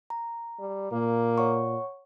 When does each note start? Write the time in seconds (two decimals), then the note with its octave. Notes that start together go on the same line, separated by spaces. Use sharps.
0.10 A#5
0.59 G3
0.92 A#2 A#3
1.38 C#5 F#5 C#6